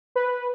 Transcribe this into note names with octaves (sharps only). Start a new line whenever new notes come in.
B4